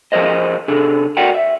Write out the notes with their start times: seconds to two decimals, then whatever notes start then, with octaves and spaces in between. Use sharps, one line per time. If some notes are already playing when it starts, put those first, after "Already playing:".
0.12 F3 G#4 A#4 C5 D#5
0.68 C3 D4 G#4 A4
1.17 F#4 A#4 D5 F#5 G5
1.34 E5